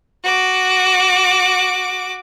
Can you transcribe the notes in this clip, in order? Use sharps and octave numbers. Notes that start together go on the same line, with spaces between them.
F#4 D6